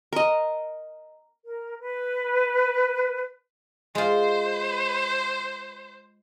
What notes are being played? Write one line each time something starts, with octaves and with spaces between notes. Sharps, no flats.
A#4 D#5
A#4
B4
G#3 F4 C5